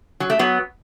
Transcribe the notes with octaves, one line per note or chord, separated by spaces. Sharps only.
F#3
A3
F#3 B3